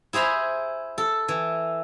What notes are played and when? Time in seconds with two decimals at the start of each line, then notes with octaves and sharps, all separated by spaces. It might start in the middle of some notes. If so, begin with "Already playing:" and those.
0.13 E4 G#4 C5 A#5 B5
0.98 A4
1.28 E3